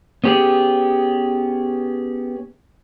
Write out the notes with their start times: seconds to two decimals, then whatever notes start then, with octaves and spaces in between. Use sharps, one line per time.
0.24 B3 C#4 G4 G#4